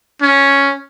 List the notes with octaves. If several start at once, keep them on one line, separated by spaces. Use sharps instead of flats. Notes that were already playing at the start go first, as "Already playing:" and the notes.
C#4